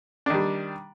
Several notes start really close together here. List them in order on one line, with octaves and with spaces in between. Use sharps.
D4 D#3 G3